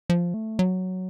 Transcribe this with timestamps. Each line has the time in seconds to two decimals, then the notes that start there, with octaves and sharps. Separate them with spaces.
0.10 F3
0.34 A3
0.59 F#3